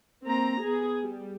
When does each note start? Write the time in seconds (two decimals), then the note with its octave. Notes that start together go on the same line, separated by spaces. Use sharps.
0.24 A#3 C4 A#5
0.60 B3 G#4
1.02 G3